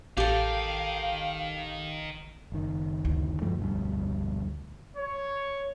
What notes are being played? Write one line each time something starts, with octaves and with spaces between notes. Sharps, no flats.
A1 D#3 G4 A4 F5
F#1 D#3
D2 E4
G2 F3 A3
F1 B1 G2
C#5